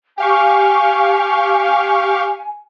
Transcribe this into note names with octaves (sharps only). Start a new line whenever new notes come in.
G4 F5 G#5 C#6